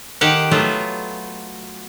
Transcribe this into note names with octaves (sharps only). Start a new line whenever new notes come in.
D#3 G4 F5 F#5
F#3 A3 B3 F4